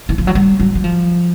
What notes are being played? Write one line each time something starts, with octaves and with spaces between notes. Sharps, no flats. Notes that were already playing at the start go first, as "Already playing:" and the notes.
E3
F3
F#3
G3
F#3
F#3
F3